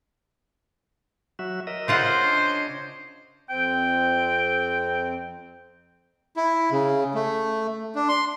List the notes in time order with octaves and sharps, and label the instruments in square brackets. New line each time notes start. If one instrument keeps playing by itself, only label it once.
[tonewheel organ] F#3 F#4 E5
A#4 D#5 E5
[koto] C#3 F4 F#5 [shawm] C5
[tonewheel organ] D4 C#5 D#5
[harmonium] F2 C4 [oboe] G5
[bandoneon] E4
C#3
A3
D4
C6